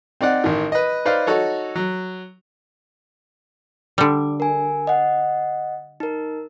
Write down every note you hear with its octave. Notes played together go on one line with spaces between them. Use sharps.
C4 D#4 D5 F#5
A1 D#3
B4 D#5
D#4 B4 C5 D5 F5
D#4 F#4 A4 C#5
F#3
D3 G3 D6
A#4 G#5
D#5 F#5
D#4 A#4